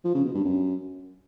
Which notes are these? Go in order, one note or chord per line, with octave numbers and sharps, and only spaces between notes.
F3
C#3
B2
G2
F#2